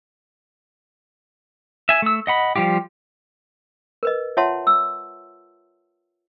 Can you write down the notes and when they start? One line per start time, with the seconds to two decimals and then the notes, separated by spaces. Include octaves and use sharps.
1.89 E5 G#5
2.02 A3 E6
2.27 D#5 F#5 B5
2.56 F3 G3 F4 G4
4.03 A#4 B4 D#5
4.37 F4 C#5 E5 F#5 A5 C6
4.67 E6